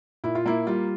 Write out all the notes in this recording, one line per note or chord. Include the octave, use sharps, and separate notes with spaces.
A#2 E4
F4
A#3 E4
G3 F4